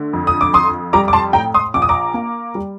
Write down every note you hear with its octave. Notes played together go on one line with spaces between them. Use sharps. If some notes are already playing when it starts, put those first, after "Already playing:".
Already playing: D3 A3
F2
D#6
D6
F2 C6 D#6
G3 A#5 D6
D6
A5 C6
A2 G5 A#5
C6 D#6
A#1 D6
D#6
A#5 D6
A#3
G3